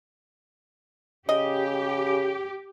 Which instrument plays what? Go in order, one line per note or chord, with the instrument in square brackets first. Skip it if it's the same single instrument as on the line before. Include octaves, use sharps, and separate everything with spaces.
[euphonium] C#3 [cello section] G4 [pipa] D#5